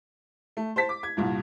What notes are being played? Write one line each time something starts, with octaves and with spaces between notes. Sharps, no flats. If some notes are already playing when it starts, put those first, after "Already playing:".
A3
C5 A5 B6
D6
G#6
C2 G2 A#2